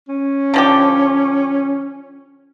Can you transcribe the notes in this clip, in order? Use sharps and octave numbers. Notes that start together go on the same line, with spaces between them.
C#4
D3 F3 G4